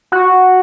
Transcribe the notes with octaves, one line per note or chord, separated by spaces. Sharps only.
F#4